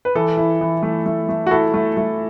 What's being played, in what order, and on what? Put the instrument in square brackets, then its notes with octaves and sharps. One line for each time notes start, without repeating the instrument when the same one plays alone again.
[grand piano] B4
[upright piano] E3 [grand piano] A4
[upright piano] E4
E3
A3
A3
A3
[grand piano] F#4
[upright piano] E4 [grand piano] A4
[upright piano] A3
A3